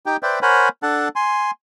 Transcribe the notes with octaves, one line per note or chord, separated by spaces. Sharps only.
D#4 G4 G5
B4 C5 D5 E5 G5
A#4 C5 C#5 F#5 G#5 B5
D4 A4 F#5 A5
G#5 C6